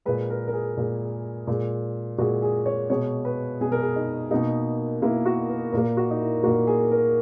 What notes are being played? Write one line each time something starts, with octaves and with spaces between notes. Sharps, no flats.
A#2 G#3 B4
A#4
A#4
G#4
A#2 G#3
A#2 G#3
A#2 G#3 F#4
G#4
C#5
B2 G#3 C#5
B4
B2 G#3 G#4
A#4
G#4
D#4
B2 A#3 D#4
B2 A#3 E4
F#4
A#4
A#2 A#3 A#4
F#4
D#4
E4
A#2 A#3 F#4
G#4
A#4